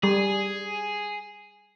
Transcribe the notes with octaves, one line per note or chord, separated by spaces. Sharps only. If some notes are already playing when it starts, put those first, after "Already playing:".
G3 G#4